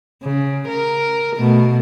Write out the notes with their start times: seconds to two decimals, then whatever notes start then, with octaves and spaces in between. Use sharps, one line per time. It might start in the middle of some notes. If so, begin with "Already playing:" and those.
0.22 C#3
0.68 A#4
1.35 B2 A3